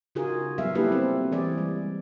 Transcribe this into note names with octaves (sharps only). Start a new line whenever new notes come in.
C#3 D#4 F4 F#4 G#4 A#4
F#3 G3 B3 G#4 E5 F5
A#3 D4 E4 G4 A4 B4
C4
E3 G#3 G#4 D5
G3